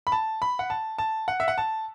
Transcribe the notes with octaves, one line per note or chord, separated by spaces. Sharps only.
B5
A5
B5
F#5
A5
A5
F#5
E5
F#5
A5